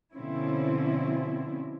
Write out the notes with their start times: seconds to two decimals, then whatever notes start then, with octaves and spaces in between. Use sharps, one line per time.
0.13 B2 D3 F3 C4 C#4 E4